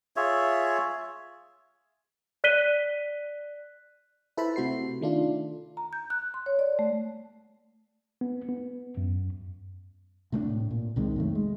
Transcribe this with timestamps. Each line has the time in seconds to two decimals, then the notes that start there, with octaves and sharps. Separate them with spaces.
0.16 F4 G#4 C#5 E5
2.44 D5 F#6 B6 D#7 G7
4.37 E4 A4 B4 C5 A5 B5
4.56 C3 A3 F#4 C5 C7
5.01 D#3 A3 D4 F4
5.77 A#5
5.93 G6
6.10 F#6
6.34 C6
6.46 C#5
6.59 D5
6.79 A3
8.21 B3
8.49 B3
8.97 F#2
10.32 C3 A3 A#3 D4
10.49 A2
10.71 A#2
10.96 C2 C3 D#3 G#3
11.16 F#2 D#3 A3
11.35 G#3